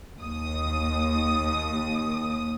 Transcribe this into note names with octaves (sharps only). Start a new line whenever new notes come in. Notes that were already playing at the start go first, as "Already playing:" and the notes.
D#2 D#6